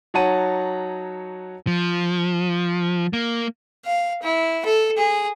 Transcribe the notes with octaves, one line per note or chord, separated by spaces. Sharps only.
F#3 D#4 C#5 F#5 A5 D#7
F3
A#3
F5
E4
A4
G#4